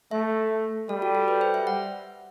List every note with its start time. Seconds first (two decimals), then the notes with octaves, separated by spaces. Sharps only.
0.11 A3 E5
0.89 G3 A4
1.02 F#4
1.15 A4
1.28 B4
1.41 C5
1.54 E5
1.67 F#5